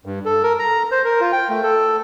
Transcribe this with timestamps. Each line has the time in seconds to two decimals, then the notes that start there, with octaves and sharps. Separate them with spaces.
0.06 G2
0.26 A4
0.43 A#4
0.59 A#5
0.92 C5
1.05 A#4
1.21 F4
1.32 G5
1.49 A3
1.63 A4